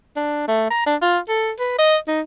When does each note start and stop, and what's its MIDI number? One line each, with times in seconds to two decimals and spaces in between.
0.16 0.47 62
0.48 0.67 57
0.70 0.86 82
0.86 0.96 62
1.02 1.18 65
1.29 1.51 69
1.59 1.74 71
1.79 1.96 75
2.08 2.21 63